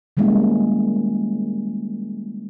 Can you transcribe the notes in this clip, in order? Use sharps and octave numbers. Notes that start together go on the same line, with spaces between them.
D#3 G3 G#3 A#3 C#4 E4